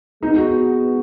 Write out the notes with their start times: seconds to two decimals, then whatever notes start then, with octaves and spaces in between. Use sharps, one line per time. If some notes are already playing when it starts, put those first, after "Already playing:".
0.22 G#3 B3 D#4
0.37 F#4